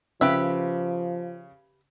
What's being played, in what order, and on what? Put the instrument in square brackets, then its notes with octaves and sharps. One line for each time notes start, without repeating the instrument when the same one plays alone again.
[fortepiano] C#3 [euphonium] F3 [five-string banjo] G4 B4 E5